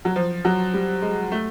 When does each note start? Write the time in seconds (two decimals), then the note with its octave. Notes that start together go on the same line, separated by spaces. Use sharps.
0.05 F#3
0.16 F3
0.45 F#3
0.74 G3
1.02 G#3
1.32 A3